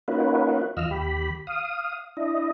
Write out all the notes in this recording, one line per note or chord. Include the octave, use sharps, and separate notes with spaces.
A#3 C#4 D#4 F4 F#4 B4
E2 F4 D#5 E6 F6
D#2 G4 B5
F5 D#6
D4 E4 D#5